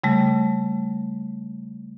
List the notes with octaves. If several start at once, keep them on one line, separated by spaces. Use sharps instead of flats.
C#3 G3 A3